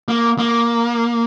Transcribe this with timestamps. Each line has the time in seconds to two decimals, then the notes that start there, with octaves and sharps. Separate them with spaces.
0.08 A#3
0.39 A#3